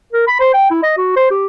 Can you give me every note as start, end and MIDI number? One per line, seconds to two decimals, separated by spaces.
0.13 0.25 70
0.28 0.37 83
0.40 0.50 72
0.54 0.70 79
0.71 0.81 64
0.83 0.94 75
0.97 1.15 66
1.16 1.27 72
1.31 1.47 67